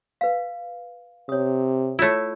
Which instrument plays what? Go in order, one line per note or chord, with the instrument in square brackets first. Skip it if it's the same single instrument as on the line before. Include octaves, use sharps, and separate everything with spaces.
[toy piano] B4 F5
[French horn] C3 [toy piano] C#5 D#6
[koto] A3 E4 [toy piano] F4 C#5